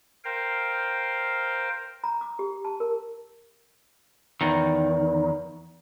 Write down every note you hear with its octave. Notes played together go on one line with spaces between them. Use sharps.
A#4 C5 F5 G5
A#5
D6
G4
A5
A#4
E2 D#3